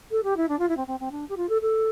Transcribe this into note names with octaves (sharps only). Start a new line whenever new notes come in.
A4
G4
E4
D4
F4
E4
C4
C4
C4
D4
G4
F4
A4
A4